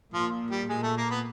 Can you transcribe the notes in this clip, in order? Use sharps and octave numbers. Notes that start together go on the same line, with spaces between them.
A#2 F3 F4
G3 G4
A#2 G#3 G#4
A3 A4
A#3 A#4
B3 B4